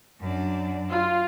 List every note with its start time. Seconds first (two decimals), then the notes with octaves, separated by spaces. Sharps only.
0.20 F#2 D4
0.91 F4